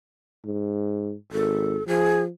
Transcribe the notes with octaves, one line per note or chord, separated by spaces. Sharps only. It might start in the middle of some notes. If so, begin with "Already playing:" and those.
G#2
G#1 A4
F3 G#4